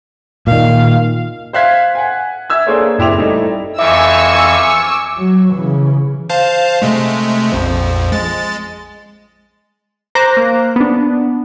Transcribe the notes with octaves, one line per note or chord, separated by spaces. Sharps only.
A#2 D#3 F5
C5 E5 F5 F#6 G#6 B6
F#5 G#5
E5 E6 G#6
A#3 D4 G#4 A4 C5 C#5
F#1 C4 E4 G4 D6 F7
G3 A3 D#4 E4
F2 E3 E5 G#5 C#6 D6 E6
F#3
C#3 E3
C5 F5 A5
C3 G#3 A3
A#1 F2 F3
G#3 A6
C5 A#5 D6 F#6 A#6
A#3
B3 D4